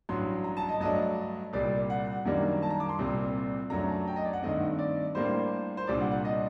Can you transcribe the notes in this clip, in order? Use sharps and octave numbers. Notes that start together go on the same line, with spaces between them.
A1 G2 F#3 C6
A#5
A5
D#5
G2 F#3 A3 D4 D#5
C2 A#2 G3 D5
F#5
F#2 D#3 G3 A#3 D4
A5
A#5
D6
C6
C2 A#2 G3 C4
F#2 F#3 A3 D4 A#5
A5
G5
D#5
D5
F#5
G2 D#3 A3 C4 D#5
D5
A2 G3 A#3 D4 C5
C5
C2 A#2 G3 D4 D5
F#5
F#5
D#5